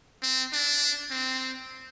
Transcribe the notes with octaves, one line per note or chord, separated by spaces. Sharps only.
C4
D4
C4